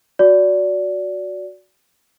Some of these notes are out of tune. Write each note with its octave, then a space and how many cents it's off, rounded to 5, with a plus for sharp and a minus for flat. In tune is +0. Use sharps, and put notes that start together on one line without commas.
F#4 -10 D5 -20